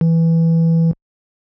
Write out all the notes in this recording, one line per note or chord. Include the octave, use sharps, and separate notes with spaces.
E3